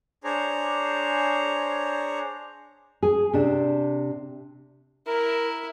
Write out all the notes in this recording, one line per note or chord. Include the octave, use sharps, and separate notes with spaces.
D4 G#4 C5 C#5 A#5
G#4
C3 D4
E4 A#4